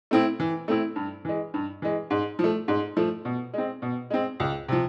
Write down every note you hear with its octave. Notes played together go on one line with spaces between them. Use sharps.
A3 C4 E4
E3
A3 C4 E4
G2
E3 G#3
G2
E3 G#3
G#2
F3 A3
G#2
F3 A3
B2
G#3 C4
B2
G#3 C4
C#2
C3 F3